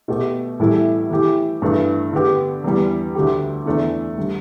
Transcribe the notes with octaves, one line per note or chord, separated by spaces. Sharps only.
B2 A3 G4
A2 E3 G3 E4 A4
E3 A3 G4
G2 E3 A3
D3 B3 G4
E2 E3 G3
D2 D3 A3 G4
E2 E3 A3 D4
D3 G3